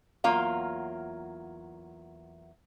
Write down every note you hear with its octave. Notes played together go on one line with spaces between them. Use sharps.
E2 F#3 A#3 F4 F5